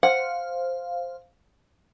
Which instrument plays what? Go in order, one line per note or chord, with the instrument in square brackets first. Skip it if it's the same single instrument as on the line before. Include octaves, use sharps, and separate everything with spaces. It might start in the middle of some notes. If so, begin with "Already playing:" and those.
[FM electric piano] C5 F5 [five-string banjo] F#5